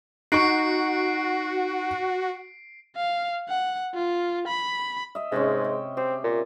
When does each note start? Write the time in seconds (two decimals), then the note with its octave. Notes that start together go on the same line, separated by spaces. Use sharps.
0.32 D#4 F#4 C#6 C7 D7
2.97 F5
3.49 F#5
3.95 F4
4.48 B5
5.15 D#5 E5
5.32 G#2 C3 G#3 C#4
5.64 G5
5.97 C4 G4
6.24 A#2